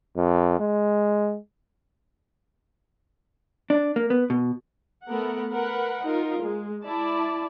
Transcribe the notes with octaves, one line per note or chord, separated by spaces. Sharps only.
F2
G#3
D4
A#3
B3
B2
A3 B3 A#4 F#5
A#4 B4 F#5
D#4 F4 A#4
G#3
E4 D5 A5